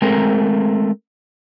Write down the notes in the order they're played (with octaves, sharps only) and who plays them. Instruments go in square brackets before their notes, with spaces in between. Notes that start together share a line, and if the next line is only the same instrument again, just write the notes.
[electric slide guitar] G#3 A3 C4 A#4